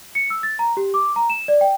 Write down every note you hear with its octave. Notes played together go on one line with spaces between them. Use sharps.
C#7
E6
A6
A#5
G4
D6
A#5
E7
D5
G5